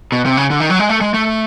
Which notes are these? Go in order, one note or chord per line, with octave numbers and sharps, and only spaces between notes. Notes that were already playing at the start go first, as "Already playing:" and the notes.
B2
C3
C#3
D3
D#3
F#3
G#3
A3
G#3
A3